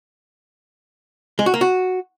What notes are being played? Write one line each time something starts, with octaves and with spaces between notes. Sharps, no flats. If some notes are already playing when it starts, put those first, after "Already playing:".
G#3
F#4
A#3
F#4